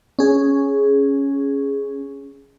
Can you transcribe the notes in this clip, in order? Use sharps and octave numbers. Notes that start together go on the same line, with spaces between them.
C#4 G#4